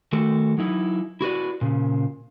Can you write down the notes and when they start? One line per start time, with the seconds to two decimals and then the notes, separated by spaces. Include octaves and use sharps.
0.13 D#3 A3 F#4 A4
0.58 F#3 D#4 E4
1.21 E4 F#4 B4 D5
1.61 A#2 C#3